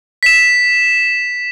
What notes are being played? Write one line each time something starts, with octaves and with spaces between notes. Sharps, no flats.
B6 E7